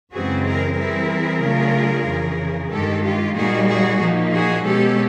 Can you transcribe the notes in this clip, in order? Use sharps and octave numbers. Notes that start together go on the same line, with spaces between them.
F#2 C#3 E3 G#3 C4 F#4 G#4
G#4 A#4
E3 G3 C4 E4 G#4 A#4
C#3 F#3 A3 D4 F4
F2 C#3 E3
G2 D#3 G#3 G4 A4
F4 G4
A#2 G3 A#3 D#4 F#4 G#4
F#4 G#4
A#2 F3 A#3 D#4
F#4 G#4
B2 G#3 C#4 G4 A4